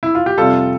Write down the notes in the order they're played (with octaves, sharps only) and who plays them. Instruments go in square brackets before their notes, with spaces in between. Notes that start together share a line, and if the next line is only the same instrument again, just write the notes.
[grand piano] E4
F4
G4
F2 C3 G3 F4 A4